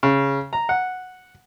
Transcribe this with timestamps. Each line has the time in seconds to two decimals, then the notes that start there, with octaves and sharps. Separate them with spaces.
0.03 C#3
0.53 A#5
0.69 F#5